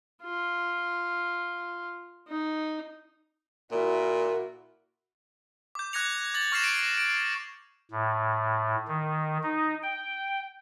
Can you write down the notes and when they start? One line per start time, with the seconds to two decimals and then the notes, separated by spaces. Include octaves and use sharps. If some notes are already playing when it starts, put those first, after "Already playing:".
0.23 F4
2.28 D#4
3.72 A#2 E4 F#4 A#4
5.75 D6 G6
5.93 D6 F#6 G#6 A#6 C#7 F7
6.34 D6 A6 F#7
6.52 C#6 F6 A#6 C7 E7 F7
6.64 D7
6.98 D7
7.91 A2
8.88 D#3
9.43 D#4
9.83 G5